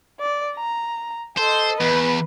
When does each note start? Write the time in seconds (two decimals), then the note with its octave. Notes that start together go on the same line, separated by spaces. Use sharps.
0.20 D5
0.56 A#5
1.38 A4 C5 D#5
1.81 E2 B4